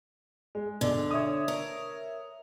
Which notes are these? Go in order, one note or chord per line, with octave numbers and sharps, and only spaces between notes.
G#3
B1 D3
C#5 E5 D#6
A#4